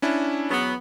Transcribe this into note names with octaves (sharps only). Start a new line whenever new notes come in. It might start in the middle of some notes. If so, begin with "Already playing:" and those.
C#4 D4 E4
E2 F#3 B3